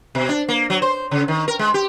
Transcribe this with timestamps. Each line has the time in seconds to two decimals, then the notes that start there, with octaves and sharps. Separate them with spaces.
0.15 B2
0.29 D4
0.49 A#3
0.70 F#3
0.82 C5
1.11 C#3
1.28 D#3
1.48 A#4
1.59 G#3
1.74 G4